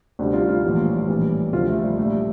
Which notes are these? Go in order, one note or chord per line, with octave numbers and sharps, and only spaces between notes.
D2 C3 G3 D4
F4
F4
A#1 A2 E3 G3
A#1 A2 E3 G3
D2 C3 F3 F4
A3
G3
A#1 A#2 G3 A3